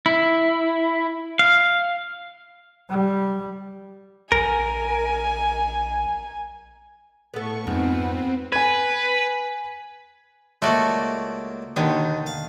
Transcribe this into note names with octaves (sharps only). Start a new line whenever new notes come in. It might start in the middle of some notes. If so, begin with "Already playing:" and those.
E4
F5
G3
A#1 A#4 G#5
A2 B3 A4 C#6
F2 G#2 B3 C4
B4 G#5 G#6
C#2 A3 A#3 F#4 D5
D#2 B2 D3 D#3
F5